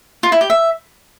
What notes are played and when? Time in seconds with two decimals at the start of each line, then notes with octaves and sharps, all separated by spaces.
0.23 F4
0.32 E4
0.41 G4
0.50 E5